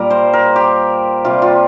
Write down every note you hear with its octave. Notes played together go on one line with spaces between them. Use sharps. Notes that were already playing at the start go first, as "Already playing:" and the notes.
Already playing: A#2 G3 A#3 A#4
C5
A#4
G4
C3 G3 A#3 F4
F4